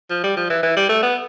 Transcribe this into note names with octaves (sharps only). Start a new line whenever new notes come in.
F3
G3
F3
E3
E3
G3
A3
B3